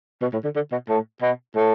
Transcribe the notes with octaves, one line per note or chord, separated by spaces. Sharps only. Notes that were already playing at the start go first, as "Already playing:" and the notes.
B2
A2
D3
D3
B2
A2
B2
A2